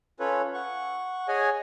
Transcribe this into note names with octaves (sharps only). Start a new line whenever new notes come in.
C#4 F4 A4 B4 C#5
F#5 C#6
G#4 C#5 D#5 F#5 G#5